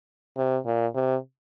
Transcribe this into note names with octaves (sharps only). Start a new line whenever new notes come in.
C3
A#2
C3